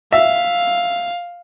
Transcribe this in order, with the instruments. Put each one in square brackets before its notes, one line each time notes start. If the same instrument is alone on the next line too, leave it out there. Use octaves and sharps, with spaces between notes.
[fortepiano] E5 [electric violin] F5